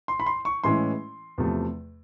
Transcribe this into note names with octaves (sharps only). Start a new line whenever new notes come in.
C6
B5
C6
C#6
A2 E3 G#3 C#4 E4 C6
E2 C3 F3 A3